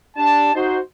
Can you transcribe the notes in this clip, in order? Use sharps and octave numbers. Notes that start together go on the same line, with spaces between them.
D4 G4 A5
D#4 F#4 C5